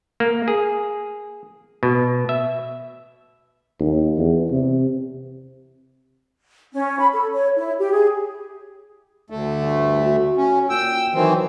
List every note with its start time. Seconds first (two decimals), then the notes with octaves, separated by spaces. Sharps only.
0.20 A#3
0.48 G#4
1.83 B2
2.29 E5
3.80 D#2
4.18 E2
4.51 C3
6.74 C#4
6.99 B5
7.12 A4
7.33 C#5
7.56 E4
7.79 G4
7.92 G#4
9.30 D2 A3
9.61 G2
10.03 F#4
10.37 C#4
10.70 A#2 G5 E6
11.14 D#3 E3 F#3 C4